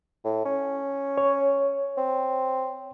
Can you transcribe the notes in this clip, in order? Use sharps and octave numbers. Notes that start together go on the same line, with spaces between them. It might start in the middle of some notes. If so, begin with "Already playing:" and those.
A2
C#4
C#5
C4